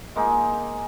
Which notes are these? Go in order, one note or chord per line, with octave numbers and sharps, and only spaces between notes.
G#3 A#3 D#4 G#4